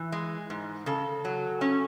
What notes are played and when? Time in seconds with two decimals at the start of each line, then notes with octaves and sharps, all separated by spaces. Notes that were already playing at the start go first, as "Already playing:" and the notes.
Already playing: E3
0.12 G#3
0.50 G#2
0.86 C#3 A4
1.25 F#3
1.61 C#4